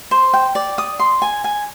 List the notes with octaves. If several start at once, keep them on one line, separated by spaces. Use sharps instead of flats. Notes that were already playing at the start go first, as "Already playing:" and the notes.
C5
G5
D5
D#6
C6
G#5
G#5